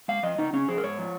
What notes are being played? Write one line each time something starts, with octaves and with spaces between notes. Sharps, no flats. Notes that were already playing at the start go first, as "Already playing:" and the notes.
G#3 F5
F3 D#5
C#3 D#4
C#3 C#4
F3 G#4
A#4
G#2 C#5
F3